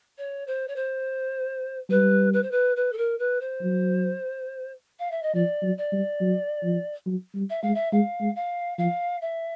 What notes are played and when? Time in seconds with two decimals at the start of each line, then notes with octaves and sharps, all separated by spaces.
0.18 C#5
0.47 C5
0.68 C#5
0.76 C5
1.90 G3 B4
2.33 B4
2.42 C5
2.51 B4
2.76 B4
2.92 A4
2.97 A#4
3.19 B4
3.40 C5
3.62 F#3
4.99 F5
5.11 E5
5.22 D#5
5.34 F3 D5
5.63 F#3
5.77 D5
5.92 G3
6.21 F#3
6.63 F3
7.06 F#3
7.35 G3
7.50 E5
7.62 G#3 F5
7.74 E5
7.92 G#3 F5
8.21 G#3
8.36 F5
8.78 F3 F5
9.21 E5